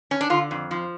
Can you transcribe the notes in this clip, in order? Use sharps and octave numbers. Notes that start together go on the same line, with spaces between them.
C#4
D4
D3 F4
F2
F3